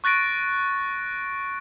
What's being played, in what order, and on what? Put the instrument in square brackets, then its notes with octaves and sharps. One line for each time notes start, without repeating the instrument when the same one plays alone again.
[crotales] C#6 F#6 A6 A#6 D7